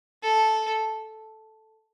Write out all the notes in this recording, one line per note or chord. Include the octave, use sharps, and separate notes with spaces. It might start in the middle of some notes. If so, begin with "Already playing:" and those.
A4